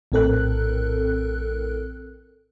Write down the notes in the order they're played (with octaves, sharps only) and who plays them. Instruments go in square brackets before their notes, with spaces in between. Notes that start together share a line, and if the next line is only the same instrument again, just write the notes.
[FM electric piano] A#1 A2 C4 A4 A#4 F#6